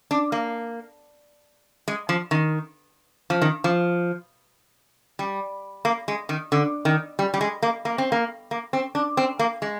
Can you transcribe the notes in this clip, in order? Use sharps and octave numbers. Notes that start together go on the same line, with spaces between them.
D4
A#3
G#3
F3
D#3
F3
D#3
F3
G3
A#3
G#3
D#3
D3
D#3
G3
G3
G#3
A#3
A#3
C4
A#3
A#3
C4
D4
C4
A#3
G#3